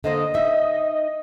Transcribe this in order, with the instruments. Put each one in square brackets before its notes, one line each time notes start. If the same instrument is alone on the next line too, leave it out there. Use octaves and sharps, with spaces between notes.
[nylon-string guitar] D3 A#3 C5 [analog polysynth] D#5
[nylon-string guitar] D#4 E5